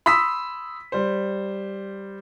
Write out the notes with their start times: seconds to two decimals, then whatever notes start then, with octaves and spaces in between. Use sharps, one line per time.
0.06 B5 C6 D#6 E6 B6
0.92 G3 C5